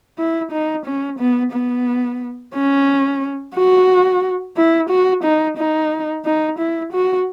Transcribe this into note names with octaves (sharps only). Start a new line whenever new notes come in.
E4
D#4
C#4
B3
B3
C#4
F#4
E4
F#4
D#4
D#4
D#4
E4
F#4